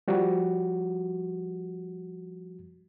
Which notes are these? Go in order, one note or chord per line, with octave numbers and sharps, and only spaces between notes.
F3 G3 F#4